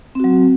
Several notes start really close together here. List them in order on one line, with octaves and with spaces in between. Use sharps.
C4 F#4 F#3